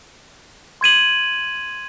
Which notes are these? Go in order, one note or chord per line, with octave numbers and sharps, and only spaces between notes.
C6 G#6 D#7 F#7